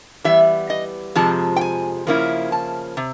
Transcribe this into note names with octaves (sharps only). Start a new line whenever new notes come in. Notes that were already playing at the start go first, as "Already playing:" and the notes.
E3 G3 B3 E5
D#5
F2 C3 F3 G#3 A5
G5
G#5
C#3 F3 A#3 C#4 E4
A5
C3